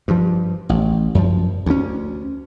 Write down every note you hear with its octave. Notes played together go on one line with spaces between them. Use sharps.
G2 F3
A1
F#2 F3
D2 C#4